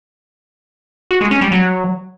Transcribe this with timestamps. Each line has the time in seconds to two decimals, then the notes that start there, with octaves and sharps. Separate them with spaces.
1.11 F#4
1.21 G#3
1.31 C#4
1.41 G3
1.52 F#3